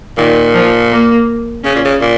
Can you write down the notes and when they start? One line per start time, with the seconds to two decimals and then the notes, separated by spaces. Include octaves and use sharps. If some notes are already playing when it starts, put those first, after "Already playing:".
0.18 A#2 D#3
0.54 F3
0.91 A#3
1.64 C#3 C#4
1.75 A#2
1.85 C#3
2.01 A#2